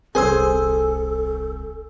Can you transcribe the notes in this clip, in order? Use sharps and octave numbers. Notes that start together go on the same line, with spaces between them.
D#1 C2 G#4 A4 C5 G#5 E6